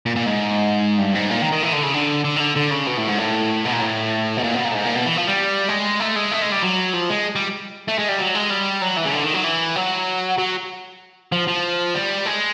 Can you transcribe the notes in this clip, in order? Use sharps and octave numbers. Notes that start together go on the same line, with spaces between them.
A#2
A#2
G#2
G2
G#2
A#2
D#3
D#3
E3
D3
C#3
D3
D3
D#3
D3
D3
C#3
B2
A2
G#2
A2
B2
A#2
A2
B2
A#2
B2
A#2
A2
G#2
A#2
B2
E3
F3
G3
G#3
A3
G#3
A3
G#3
G3
F#3
F3
G#3
G3
A3
G#3
G3
F#3
G#3
G3
F#3
E3
C#3
D3
D#3
F#3
E3
F#3
F#3
F3
F3
G3
G#3